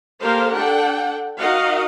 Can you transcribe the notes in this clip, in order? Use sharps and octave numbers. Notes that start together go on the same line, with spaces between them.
A#3 G4 A4 A#4 C5 F5
D4 A4 F#5 G5
D#4 F#4 A#4 D#5 F5 F#5